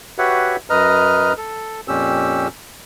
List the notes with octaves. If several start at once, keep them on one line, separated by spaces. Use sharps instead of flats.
F#4 G4 B4 C#5 E5 F#5
F#2 B4 D#5 A#5 F6
A4
F2 A#2 C#4 G4 E6